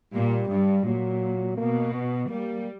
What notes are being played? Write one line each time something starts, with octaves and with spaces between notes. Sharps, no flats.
A#2 G3
G2
A#2 F#3
B2 A#3
B3
G3 A#3